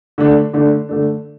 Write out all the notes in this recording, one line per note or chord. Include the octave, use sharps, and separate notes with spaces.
D3 A3 D4
D3 A3 D4
D3 A3 D4